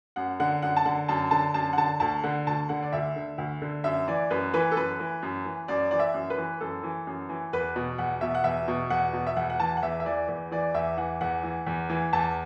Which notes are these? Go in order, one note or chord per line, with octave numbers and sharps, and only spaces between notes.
F#2 F#5
D3 F#5
F#2 F#5
A5
D3 F#5
F#2 A5
D3 A5
F#2 A5
F#5
D3 A5
D2 A5
D3 F#5
D2 A5
D3 F#5
D5
D2 E5
D3
D2
D3
F#2 E5
E3 D5
F#2 B4
E3 B4
A4
F#2 B4
E3
F#2
E3
F#2 D5
E3 D5
E5
F#2
B4
E3
F#2 A4
E3
F#2
E3
E2 B4
B2
E2 F#5
B2 E5
F#5
E2 E5
B2
E2 F#5
B2
E5
E2 F#5
F#5
E3 A5
F#5
E2 E5
E5
E3 D5
E2
E3 D5
E2 E5
E3 F#5
E2 F#5
E3
E2
E3
E2 A5